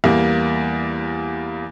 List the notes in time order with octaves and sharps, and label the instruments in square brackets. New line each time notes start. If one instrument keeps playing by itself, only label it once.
[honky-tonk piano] E2 G3 A#3